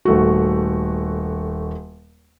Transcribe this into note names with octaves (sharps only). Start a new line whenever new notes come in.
D#1 A3 F#4